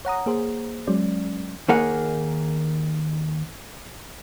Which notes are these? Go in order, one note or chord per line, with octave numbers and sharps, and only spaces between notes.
C#5 F#5 A#5 D#6
A#3 G#4 C5
F#3 G#3 C#4 D5
D#2 D#3 A#3 G#4 F#5